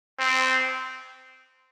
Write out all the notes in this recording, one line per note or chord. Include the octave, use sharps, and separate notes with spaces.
C4